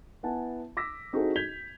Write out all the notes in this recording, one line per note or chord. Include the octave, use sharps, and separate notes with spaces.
B3 E4 F#5 G#5 A5
D6 E6 A#6 B6
C4 D#4 E4 F#4 G#4 A4
G6 G#6 B6 F7 G7